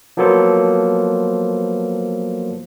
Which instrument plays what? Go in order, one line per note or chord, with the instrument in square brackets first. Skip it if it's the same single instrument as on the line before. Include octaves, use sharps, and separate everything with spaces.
[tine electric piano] F3 F#3 A#3 B3 A4 C5